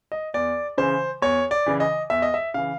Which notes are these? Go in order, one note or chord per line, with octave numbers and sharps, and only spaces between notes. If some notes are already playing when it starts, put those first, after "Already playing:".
D#5
E2 D5
C#3 E3 C5
E2 C#5
D5
C#3 E3
D#5
E2 E5
D#5
E5
C#3 E3 F5